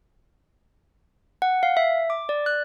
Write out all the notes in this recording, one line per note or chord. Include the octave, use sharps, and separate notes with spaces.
F#5
F5
E5
D6
D5
F#6